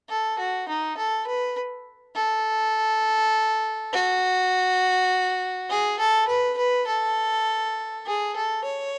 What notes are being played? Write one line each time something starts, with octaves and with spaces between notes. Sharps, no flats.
A4
F#4
D#4
A4
B4
A4
F#4
G#4
A4
B4
B4
A4
G#4
A4
C#5